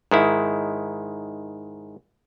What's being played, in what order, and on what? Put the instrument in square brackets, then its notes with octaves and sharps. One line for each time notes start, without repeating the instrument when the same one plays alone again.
[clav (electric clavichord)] G#2 D#3 E4